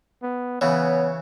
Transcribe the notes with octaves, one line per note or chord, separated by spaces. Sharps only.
B3
C#3 E3 B3 C#5